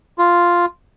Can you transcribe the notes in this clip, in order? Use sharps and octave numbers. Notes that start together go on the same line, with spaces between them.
F4